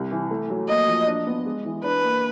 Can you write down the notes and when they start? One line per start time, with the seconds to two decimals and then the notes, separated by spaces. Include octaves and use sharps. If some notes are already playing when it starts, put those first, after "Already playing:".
Already playing: C2
0.11 E3
0.31 A3
0.50 F#3
0.68 A#3 D#5
0.88 F3
1.07 D4
1.27 B3
1.46 G#3
1.65 E3
1.84 D4 B4
2.04 A#3